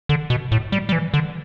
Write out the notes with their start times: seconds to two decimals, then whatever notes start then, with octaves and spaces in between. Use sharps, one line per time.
0.09 D3
0.30 B2
0.52 A2
0.72 G3
0.89 G3
0.92 E3
1.14 D3